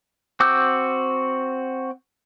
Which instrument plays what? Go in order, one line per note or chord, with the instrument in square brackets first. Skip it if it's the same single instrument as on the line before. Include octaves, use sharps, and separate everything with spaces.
[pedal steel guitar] C4 F#4 D6 E6 G6